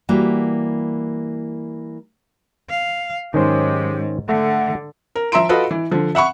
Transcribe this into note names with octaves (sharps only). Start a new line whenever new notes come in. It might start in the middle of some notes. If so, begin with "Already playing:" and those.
E3 G3 A#3 F#4
F5
G#2 D#3 F#3 G#3 C#4 G4 C5
D3 A3 F#5
A#4
F3 E5 A#5 C6 D7
F4 F#4 A4 B4 D#5
E3
D3 F3
E5 F#5 B5 C#6